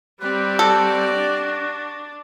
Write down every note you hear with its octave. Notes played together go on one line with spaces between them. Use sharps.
G3 C4 G4 B4 D5
F#4 A4
D4